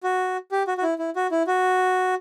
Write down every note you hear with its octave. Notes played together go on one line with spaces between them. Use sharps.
F#4
G4
F#4
F#4
E4
E4
F#4
E4
F#4